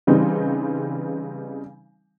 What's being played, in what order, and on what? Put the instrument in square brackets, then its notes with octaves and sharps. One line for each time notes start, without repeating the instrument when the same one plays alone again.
[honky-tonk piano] C#3 E3 G3 C4 D#4